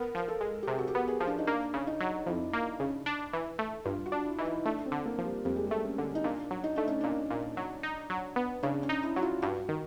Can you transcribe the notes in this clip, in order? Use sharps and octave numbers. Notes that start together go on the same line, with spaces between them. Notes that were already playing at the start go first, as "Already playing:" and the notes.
Already playing: B3 A#4
F3 A#4
A4
G#3
G4
C3 G#4
F#4
G4
B3
G#4
F3
D4
D#4
A#3 D4
C#3
D#4
F#3
F2 E4
A#3
C#3
D4
E3
A3
G2 F4
F#4
D4
E4
E3 D#4
E4
A3 D4
C4
D3
A#3
F3
G3
F2 G3
G#3
G3 A3
C#4
D3
D#4
A#2 D4
F#3
D#4
A3 D4
C#4
A#2 D4
A#2
F#3
D#4
F#3
B3
C#3 D4
C#4
D#4
E4
F#3 F#4
F4
G2 F#4
D#3